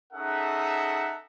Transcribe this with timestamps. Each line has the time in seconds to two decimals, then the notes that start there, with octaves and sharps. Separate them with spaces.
0.13 C#4 D#4 G#4 A4 E5 F#5